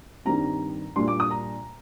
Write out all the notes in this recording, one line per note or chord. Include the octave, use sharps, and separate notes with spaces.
G2 D#3 G3 C4 A#5
A#2 G3 D4 C6
D6
D#6
A#5